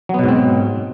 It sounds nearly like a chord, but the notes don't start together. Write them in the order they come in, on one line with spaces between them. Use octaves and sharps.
F#3 B3 B2 G#2 C4